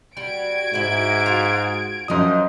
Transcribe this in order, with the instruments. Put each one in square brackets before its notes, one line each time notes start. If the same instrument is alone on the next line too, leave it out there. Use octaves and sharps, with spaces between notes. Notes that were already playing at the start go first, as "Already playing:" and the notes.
[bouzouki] G3 [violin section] F#4 G#6 D7
[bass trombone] G#2 [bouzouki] E4 E5
[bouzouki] F4
[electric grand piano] F#2 F3 D#6 [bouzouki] D#4 D#5